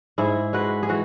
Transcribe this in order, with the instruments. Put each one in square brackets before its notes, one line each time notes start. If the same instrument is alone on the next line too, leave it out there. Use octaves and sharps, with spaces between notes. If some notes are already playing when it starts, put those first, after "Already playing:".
[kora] G#2 E4 G#4
G#3 F#4 B4
G#4
E3 F#4